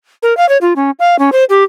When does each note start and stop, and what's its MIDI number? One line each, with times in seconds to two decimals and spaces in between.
0.23 0.36 70
0.37 0.48 77
0.49 0.58 73
0.61 0.73 65
0.76 0.91 61
0.99 1.18 77
1.19 1.30 61
1.32 1.44 72
1.49 1.64 67